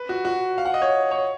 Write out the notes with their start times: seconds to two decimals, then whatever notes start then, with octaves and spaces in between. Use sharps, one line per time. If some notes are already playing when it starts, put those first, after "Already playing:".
Already playing: B4
0.09 F#4
0.25 F#4
0.58 F5
0.65 F#5
0.74 D#5
0.82 C#5
1.11 C#5